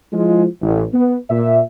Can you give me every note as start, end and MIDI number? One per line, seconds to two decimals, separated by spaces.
0.13 0.45 53
0.13 0.45 56
0.13 0.45 64
0.13 0.45 65
0.61 0.84 33
0.93 1.18 59
1.30 1.60 46
1.30 1.60 76